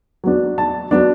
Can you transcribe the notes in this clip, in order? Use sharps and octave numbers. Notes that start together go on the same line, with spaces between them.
F#3 B3 D4
A5
F#3 B3 D4